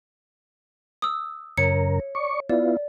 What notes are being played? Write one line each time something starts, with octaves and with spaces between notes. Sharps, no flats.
D#6 E6
F#2 C#3 A#4 C#5 C#7
D5 C#6
B3 E4 F4 D5